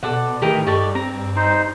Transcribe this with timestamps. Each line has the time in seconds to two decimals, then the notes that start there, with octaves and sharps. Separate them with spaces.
0.03 B2 A4 D5 F#5
0.42 A2 D#3 E3 A3 G4 A#4 D#5
0.67 G2 D#4 G4 A4 D5 C#6
0.95 C4 A#5
1.36 D#4 C5